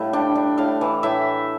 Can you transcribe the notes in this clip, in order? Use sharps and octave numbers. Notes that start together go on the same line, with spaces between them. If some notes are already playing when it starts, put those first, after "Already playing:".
Already playing: A2 G3 F5
D4 G5
D4
A2 F5
E3
A2 E5